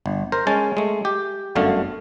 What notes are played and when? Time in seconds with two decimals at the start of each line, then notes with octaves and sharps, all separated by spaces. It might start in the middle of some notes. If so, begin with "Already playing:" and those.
0.06 G1
0.32 A#4 C5
0.47 G#3 C#4 G#5 A5
0.77 G#3 A3
1.05 G4
1.55 G1 F#2 D3 A3 F5